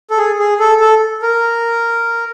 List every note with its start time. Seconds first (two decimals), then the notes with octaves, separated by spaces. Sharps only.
0.10 A4
0.18 G#4
0.39 G#4
0.60 A4
0.80 A4
1.22 A#4